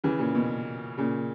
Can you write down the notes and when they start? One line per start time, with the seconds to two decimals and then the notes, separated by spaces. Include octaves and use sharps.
0.04 C#3 E3
0.19 A#2 C#3
0.35 B2
0.98 A#2 C#3